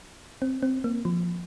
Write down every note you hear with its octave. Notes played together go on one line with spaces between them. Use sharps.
C4
C4
A#3
F3